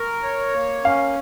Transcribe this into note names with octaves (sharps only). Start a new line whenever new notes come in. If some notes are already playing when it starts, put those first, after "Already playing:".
Already playing: A#4 C#6
C#5
A#3
C#4 F5